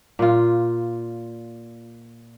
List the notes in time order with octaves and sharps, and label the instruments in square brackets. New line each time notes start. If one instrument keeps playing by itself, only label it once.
[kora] A#2 F4